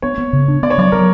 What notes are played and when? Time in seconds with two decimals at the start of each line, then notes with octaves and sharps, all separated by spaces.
0.02 B3 C#5
0.18 B3
0.33 C#3
0.48 D4
0.63 B3 D5
0.70 C#5
0.78 F#3 D5
0.92 F#3 A#4